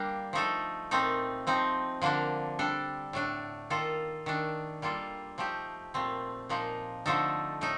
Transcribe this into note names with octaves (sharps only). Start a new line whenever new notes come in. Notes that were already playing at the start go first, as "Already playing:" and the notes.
Already playing: G3 A#3 D4
F3 A3 D#4 A4
A#2 A3 C4 D#4
F3 C4 D#4
D3 F3 A#3 D4
G3 D4 A4
A2 A3 D4
D#3 A#3 F4 A4
D#3 A3 D4
G3 A#3 F4 A4
F3 A3 D#4 G4
A#2 A3 C4
A#2 F3 A#3 D#4
D3 F3 A3 D#4 A4
A2 A3 D#4